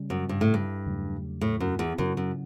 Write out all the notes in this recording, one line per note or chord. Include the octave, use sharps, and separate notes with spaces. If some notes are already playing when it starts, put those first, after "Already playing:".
Already playing: C#3 G3 C#4
F#2
G2
A2
G2
E2 C#3 F#3 A3
A2
F#2
E2
F#2 C#3 F#3 C#4
F#2